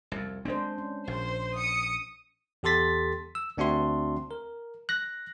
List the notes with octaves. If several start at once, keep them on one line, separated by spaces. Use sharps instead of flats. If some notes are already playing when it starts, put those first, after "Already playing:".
C2 F2
G#3 C4 D4 C5
C#4
A#1 C5
D#6 C#7
E2 G4 A4 C6 A6 B6
E6
D2 C4 D4 F#4 E5 C6
A#4
F#6 A#6